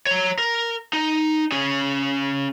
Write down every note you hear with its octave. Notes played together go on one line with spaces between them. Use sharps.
C#5 A#5
A#4
D#4
C#4 G#4